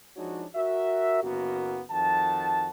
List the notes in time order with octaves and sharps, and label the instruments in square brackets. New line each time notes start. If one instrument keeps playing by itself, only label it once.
[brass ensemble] F3 G#3 D4 D#4 F#4 C#5
F#4 A#4 E5
F#1 F#2 A#3 B3 F#4
F2 D#3 F#4 A5